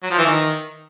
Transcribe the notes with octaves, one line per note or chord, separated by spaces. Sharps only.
F#3
F3
E3
D#3